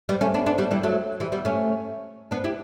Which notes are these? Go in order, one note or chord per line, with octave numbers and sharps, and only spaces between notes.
G3 B3
A3 C#4
B3 D4
B3 D4
G3 B3
E3 G3
F#3 A3
E3 G3
G3 B3
A3 C#4
B3 D4
E4 G4